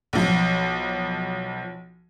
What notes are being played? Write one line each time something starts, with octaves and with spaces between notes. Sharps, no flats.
B1 F3